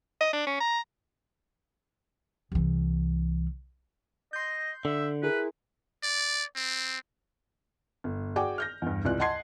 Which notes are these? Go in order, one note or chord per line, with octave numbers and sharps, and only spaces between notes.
D#5
D4
C#4
A#5
C2 E3
D#5 C6 G6
D3 E5
E4 G#4 A#4 B4
D5
C4
G1
F#4 G#4 D5 G5 G#5 D6
F6 G6 A#6
E2 G2
C#2 C3 E4 F4 D5 F#6
D#5 F#5 A5 C6 G#6 C7